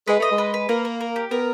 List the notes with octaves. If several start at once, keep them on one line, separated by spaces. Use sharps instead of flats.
G#3 B4
A3 D#5
G#3
B4
B4
A#3 A#4
A#4
A#4
G4
B3 A#4